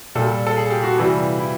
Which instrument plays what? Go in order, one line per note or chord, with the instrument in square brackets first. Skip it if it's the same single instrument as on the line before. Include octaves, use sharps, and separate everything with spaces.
[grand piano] A#2 G3 A4
A4
G#4
G4
F#4
C3 E3 G3
E4